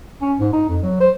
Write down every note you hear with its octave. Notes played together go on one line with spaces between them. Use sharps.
C#4
G#2
D#4
F2
F#3
C5